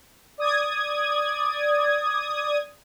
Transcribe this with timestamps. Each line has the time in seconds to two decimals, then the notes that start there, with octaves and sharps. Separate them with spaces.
0.38 D5 D#6 G#6